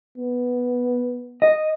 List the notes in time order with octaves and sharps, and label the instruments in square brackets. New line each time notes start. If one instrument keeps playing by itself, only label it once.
[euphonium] B3
[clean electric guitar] D#5